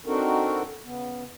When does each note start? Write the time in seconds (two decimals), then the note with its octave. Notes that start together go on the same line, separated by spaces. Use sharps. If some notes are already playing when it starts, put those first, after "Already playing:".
0.06 C4 D4 D#4 F#4 A4 A#4
0.85 C#3 B3